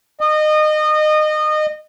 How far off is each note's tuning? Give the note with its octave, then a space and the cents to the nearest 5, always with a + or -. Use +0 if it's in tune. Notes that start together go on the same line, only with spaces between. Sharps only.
D#5 -25